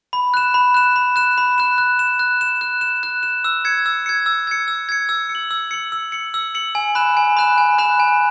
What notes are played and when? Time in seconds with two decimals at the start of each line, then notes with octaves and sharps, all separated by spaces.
0.13 B5
0.34 F#6 E7
0.54 B5
0.74 F#6 E7
0.96 B5
1.16 F#6 E7
1.38 B5
1.58 F#6 E7
1.78 F#6
1.99 E7
2.19 F#6
2.41 E7
2.61 F#6
2.81 E7
3.03 F#6
3.23 E7
3.44 E6
3.65 G#6 C#7
3.86 E6
4.06 G#6 C#7
4.26 E6
4.47 G#6 C#7
4.68 E6
4.89 G#6 C#7
5.09 E6
5.29 C#7
5.35 F#7
5.51 E6
5.71 C#7 F#7
5.92 E6
6.12 C#7 F#7
6.34 E6
6.55 C#7 F#7
6.75 G#5
6.95 B5 F#6 E7
7.17 G#5
7.37 B5 F#6 E7
7.58 G#5
7.78 B5 F#6 E7
8.00 G#5